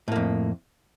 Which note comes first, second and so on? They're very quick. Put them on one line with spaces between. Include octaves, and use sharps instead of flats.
A2 A#3 F2